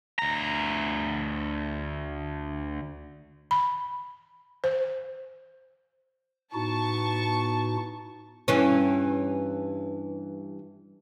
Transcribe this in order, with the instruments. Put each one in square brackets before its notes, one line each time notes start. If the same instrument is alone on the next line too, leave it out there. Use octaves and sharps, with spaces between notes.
[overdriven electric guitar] D2 A#5
[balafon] B5
C5
[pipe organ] A2 D#4 F#4 [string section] B3 A5 C#6
[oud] G2 E3 C#4